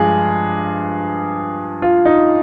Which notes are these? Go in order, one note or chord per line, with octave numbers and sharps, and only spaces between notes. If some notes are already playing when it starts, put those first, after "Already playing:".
Already playing: G2 F3 G#3 G#4
F4
D#4